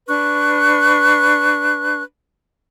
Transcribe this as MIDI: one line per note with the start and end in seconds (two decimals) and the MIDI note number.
0.07 2.02 62
0.07 2.02 71
0.07 2.02 85
0.07 2.02 90